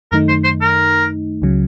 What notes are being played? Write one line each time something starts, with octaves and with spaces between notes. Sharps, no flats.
F#2 D#3 A3 D#4 A#4
C5
C5
A#4
C#2 C#3 F#3